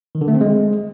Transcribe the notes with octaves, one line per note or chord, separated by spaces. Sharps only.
D#3
D3
A3
C4
G#3